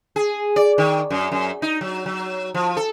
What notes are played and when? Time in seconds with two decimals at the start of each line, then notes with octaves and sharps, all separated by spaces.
0.16 G#4
0.56 D5
0.78 D#3
1.10 F#2
1.32 F#2
1.62 D#4
1.81 F#3
2.06 F#3
2.54 F3
2.77 A4